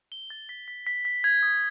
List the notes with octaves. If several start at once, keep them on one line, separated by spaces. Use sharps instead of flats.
G7
A6
B6
B6
B6
B6
G#6
D#6